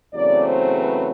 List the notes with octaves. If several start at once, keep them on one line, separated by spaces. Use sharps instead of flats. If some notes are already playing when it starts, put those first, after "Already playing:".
E2 C#3 F#3 A3 C4 D5
C5
B4